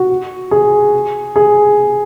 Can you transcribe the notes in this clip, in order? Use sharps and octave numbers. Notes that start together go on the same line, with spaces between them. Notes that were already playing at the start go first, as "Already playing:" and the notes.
Already playing: F#4
G#4
G#4